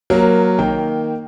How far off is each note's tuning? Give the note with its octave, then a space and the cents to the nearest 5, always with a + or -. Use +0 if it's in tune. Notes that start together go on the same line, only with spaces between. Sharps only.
F#3 +0 A#3 +10 A#4 +0
D#3 +0 A#3 +0 G5 +0